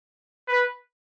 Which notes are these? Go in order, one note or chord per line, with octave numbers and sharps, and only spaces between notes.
B4